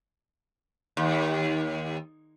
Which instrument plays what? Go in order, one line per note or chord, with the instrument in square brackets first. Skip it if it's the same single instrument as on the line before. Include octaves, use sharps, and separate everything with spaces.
[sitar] D#2